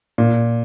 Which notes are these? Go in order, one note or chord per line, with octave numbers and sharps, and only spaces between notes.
A#2